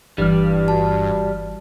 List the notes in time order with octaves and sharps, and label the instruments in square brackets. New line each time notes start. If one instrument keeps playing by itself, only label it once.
[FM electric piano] G1 E3 F6 [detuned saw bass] G2 [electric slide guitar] G3
[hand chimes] F#4 A5